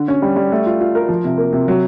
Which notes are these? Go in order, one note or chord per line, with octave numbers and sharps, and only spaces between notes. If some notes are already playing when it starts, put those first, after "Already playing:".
Already playing: D3
C#4
G3
G3
A3
F4
F4
A#4
F3
C3
A#3
C3
F#3